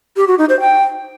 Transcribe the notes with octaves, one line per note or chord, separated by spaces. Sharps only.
G4
F#4
D#4
C5
G5